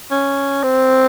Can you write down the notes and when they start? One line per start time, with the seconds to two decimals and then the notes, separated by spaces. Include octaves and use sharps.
0.11 C#4
0.63 C4